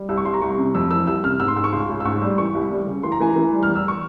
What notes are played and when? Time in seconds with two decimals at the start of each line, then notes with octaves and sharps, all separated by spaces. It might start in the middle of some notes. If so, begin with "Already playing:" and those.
Already playing: G3
0.09 C2 E6
0.17 C#6
0.25 C2 C6
0.34 A#5
0.42 C2 C#6
0.58 C3
0.75 F2 E6
0.91 E3 E6
1.07 C2 E6
1.24 C3 F6
1.40 G#2 E6
1.48 C6
1.56 G#2 E6
1.64 C#6
1.73 C#2 C6
1.89 C#2
2.00 E6
2.05 G#2 C#6
2.22 G3 E6
2.38 E3 C#6
2.55 C2
2.71 G3
2.86 C#3
3.03 E3 C6
3.12 A#5
3.20 E3 G#5
3.30 A#5
3.36 E3
3.53 G3
3.63 F6
3.68 E2
3.75 E6
3.88 C#6